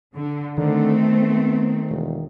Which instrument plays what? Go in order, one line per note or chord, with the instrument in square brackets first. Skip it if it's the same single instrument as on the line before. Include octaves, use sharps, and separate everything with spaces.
[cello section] D3
[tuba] D3 [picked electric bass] D#3 [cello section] A3 C4
[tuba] B3
E1